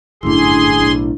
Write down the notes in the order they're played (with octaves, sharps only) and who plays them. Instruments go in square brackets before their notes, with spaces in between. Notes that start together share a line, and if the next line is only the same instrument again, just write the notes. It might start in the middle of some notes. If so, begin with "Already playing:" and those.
[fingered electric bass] G1 F#2 A2 [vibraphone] D4 E4 [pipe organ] G#4 C6
[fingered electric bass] B1 A2